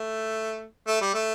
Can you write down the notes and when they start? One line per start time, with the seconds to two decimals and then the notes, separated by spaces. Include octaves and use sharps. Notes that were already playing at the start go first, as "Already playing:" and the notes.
Already playing: A3
0.87 A3
1.01 G3
1.14 A3